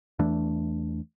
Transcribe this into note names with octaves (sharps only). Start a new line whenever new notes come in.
E2 E3 A3 D4